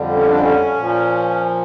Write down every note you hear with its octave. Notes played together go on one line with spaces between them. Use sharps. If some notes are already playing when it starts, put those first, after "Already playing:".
Already playing: F2 D3 G3
C#4
D4
C#4
A#2 F3